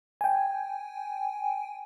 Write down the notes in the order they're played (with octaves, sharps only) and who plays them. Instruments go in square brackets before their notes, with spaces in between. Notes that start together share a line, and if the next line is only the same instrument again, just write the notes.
[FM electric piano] G5 G#5